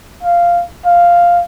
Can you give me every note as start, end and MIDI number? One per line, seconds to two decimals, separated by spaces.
0.23 0.62 77
0.85 1.42 77